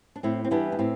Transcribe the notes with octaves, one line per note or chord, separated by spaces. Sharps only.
D4
A2 C4 E4
C4
E3 G3 B3 D4
D4
A2 C4